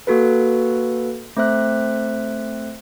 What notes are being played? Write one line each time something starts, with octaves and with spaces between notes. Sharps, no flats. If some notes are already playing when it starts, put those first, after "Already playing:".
A#3 F#4 A4 B4
A3 C4 C5 E5 F#6